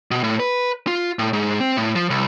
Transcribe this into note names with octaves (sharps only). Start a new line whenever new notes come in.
B2
A2
B4
F4
A2
G#2
C4
A2
F3
C2